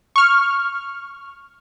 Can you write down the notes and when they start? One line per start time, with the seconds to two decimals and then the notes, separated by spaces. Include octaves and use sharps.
0.16 C#6 F6